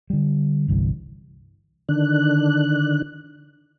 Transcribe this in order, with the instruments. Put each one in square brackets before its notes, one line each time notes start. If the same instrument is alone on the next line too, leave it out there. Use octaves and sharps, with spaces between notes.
[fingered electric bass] D3 G3
G1 C2 G2 E3
[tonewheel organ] D3 D#3 D4 F#6